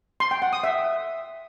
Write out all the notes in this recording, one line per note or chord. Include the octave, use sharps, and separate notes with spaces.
C6
G5
F#5
D#6
E5